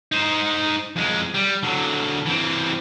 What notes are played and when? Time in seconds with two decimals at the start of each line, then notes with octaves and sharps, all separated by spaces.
0.12 D#4 C5
0.96 F2 G#3
1.34 G3
1.63 D3 F#3
2.26 E3 C4